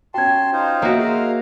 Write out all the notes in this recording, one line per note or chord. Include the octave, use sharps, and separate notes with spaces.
C#4 F#4 G5 A5 C6 G#6
D#4 F4 C5
A#3 F#4 C#5 D#5 E5
G#4 F5 A#5